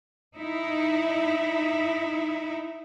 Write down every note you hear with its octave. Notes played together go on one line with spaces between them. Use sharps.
D#4 E4